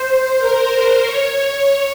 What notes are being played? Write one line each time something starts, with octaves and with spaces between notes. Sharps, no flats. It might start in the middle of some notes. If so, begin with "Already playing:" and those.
Already playing: C5
A#4
C#5